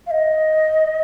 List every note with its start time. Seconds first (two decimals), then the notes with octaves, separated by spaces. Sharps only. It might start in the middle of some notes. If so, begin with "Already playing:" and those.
0.06 F5
0.10 D#5